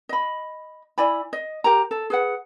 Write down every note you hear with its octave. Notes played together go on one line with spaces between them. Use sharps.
D#5 B5
E4 D5 G#5 B5
D#5
G4 A#4 A#5
A4
G#4 B4 F#5